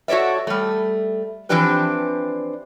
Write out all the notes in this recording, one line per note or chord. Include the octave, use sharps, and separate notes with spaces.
F#4 A4 C#5 D5 E5
G3 A3
E3 F3 C4 D4 G4 B4